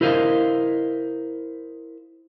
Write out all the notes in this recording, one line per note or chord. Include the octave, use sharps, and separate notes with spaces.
E4 A#4 C5 D#5 F5